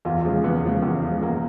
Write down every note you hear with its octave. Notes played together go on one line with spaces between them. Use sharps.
E2 F4
C#3 F3 G#3
E2 B3
C#3 F3 G#3
E2
C#3 F3 G#3
E2 A#3